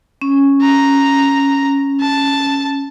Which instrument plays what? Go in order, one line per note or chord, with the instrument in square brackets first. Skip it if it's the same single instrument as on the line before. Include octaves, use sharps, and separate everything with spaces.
[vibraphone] C#4
[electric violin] A#5
A5